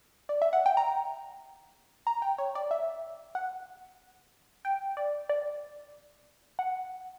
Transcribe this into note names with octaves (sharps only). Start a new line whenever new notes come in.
D5
E5
F#5
G5
A#5
A#5
G5
C#5
D5
E5
F#5
G5
D5
D5
F#5